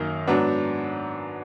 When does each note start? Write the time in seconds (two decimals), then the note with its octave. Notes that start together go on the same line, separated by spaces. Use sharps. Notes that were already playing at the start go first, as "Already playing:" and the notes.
Already playing: F#2 D#3 A#3 D#4 A#4
0.27 G#2 F#3 B3 D4